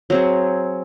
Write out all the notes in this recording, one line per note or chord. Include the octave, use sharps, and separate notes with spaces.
F#3 C4 G#4